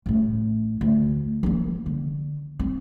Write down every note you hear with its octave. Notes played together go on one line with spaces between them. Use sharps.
A1 A2
D2
F3 A#3
D3
C4